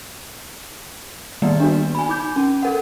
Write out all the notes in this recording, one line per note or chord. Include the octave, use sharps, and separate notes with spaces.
D#3 G3 A#3 B3 D5
D4 F#4
G#5 B5
D#4 D6 G6
C#4
A4 A#4 F#5